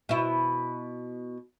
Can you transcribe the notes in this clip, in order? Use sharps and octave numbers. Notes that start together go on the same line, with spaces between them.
B2 E4